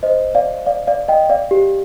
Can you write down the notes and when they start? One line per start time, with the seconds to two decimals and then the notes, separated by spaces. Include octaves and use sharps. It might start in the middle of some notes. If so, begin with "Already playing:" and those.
0.03 C5 D#5
0.35 D5 F5
0.66 D5 F5
0.87 D5 F5
1.08 D#5 G5
1.30 D5 F5
1.51 G4